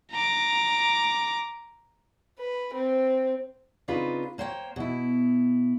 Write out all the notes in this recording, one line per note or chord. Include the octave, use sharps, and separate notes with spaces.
A#5 D6
B4
C4
C#3 C4 D4 D#4 F4 B4
A#3 C5 C#5 F#5 G5
B2 E4